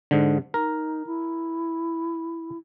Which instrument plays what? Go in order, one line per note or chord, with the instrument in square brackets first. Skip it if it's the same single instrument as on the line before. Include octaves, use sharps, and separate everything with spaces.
[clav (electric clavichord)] G#2 D3
[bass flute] D#4 [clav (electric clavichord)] A#4
[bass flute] E4